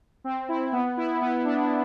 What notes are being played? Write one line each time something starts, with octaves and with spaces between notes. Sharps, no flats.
C4
E4
B3
E4
B3
D4